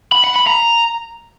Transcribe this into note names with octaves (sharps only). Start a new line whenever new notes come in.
B5
F#5
B5
A#5